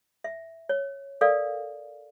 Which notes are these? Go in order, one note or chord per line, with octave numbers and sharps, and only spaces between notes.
E5
C#5
A4 A#4 D5 F5